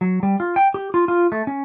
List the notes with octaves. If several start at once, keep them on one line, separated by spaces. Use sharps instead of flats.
F#3
G3
F4
G5
G4
F4
F4
A3
C#4